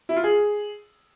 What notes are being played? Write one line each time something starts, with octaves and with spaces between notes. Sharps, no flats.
E4
F4
G#4